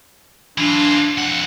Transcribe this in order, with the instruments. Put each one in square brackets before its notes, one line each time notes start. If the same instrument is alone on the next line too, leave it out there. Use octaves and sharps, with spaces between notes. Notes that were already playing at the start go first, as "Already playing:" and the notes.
[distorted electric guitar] E3 F4 [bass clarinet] D4
[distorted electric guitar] F2 F#5